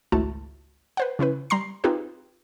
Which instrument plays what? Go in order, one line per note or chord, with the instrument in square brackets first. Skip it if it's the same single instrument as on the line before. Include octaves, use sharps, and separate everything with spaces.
[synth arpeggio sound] G#1 C#2 A3 E4 F#4 A5
B4 C5 F#5
C#3 C#4 E4 B4
G3 A#5 C6 C7
C4 D#4 F4 G4 G#4 B4